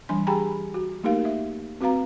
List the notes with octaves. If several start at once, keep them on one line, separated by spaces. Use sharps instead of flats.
E3 G3 D4 G#5 C6
G4 G#4 G5 G#5 A#5 B5
F#4
A3 A#3 D#4 G4 A#4 F5
E5
C4 F#4 B4 F5 A#5